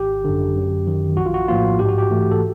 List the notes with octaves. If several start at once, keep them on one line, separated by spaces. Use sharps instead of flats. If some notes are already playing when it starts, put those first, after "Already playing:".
Already playing: G#1 G4
F#2 D3
F#2
D#3 F#3
A#1 F#4
F4
F#4
A2 F3 A#3 F4
G#2 G4
F#4
G4
E3 A3
A4